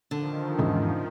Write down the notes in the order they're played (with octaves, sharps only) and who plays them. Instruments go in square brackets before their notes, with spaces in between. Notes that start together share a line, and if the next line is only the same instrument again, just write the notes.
[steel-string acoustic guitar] D3 [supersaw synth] D#3 F3
[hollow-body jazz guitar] E2 G#2 C#3